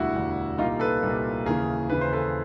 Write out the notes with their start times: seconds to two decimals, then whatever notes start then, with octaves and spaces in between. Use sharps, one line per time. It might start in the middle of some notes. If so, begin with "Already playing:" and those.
Already playing: E1 D2 D3 G3 E4 F#4
0.14 E1 D2 D3 G3
0.58 C2 A#2 G3 A#3 D#4 F4
0.80 A4 B4
1.02 C2 A#2 G3 A#3
1.46 D#2 C#3 E3 G#4 A#4
1.89 D#2 C#3 E3 B4
2.01 C5
2.13 A4 B4